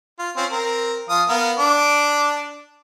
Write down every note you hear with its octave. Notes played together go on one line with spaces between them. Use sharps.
F4
C4 C#4 F4
C4 A#4
F3 F5 D#6
B3 A#4 F5
D4 D6